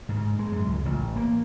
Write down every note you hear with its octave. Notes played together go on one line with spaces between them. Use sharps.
G#2
G#3
F#2
C#2
A1
A#3